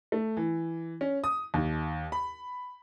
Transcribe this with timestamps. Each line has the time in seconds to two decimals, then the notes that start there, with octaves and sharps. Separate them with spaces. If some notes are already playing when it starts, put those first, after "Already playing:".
0.12 A3
0.37 E3
1.01 C#4
1.24 D#6
1.54 D#2
2.12 B5